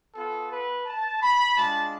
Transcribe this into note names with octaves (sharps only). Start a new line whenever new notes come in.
B3 F4 A4
B4
A5
B5
G#3 D4 F4 A5